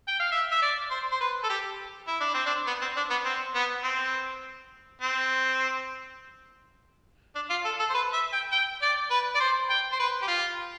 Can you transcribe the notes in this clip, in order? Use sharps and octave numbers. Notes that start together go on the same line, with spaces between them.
G5
F5
E5
E5
D5
C5
C5
B4
A4
G4
E4
D4
C4
D4
B3
C4
D4
B3
C4
B3
C4
C4
D4
F4
A4
A4
C5
B4
E5
G5
G5
D5
B4
D5
C5
G5
C5
B4
G4
F4